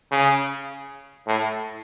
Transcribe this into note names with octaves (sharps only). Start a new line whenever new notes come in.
C#3
A2